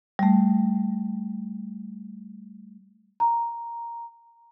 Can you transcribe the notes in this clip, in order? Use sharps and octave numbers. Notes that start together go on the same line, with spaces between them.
G3 A3
A#5